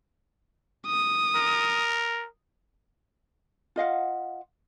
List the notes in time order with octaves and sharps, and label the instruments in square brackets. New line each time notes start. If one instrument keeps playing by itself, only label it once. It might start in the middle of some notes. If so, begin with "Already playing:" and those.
[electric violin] D#6
[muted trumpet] A#4
[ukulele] F4 D#5 F5 F#5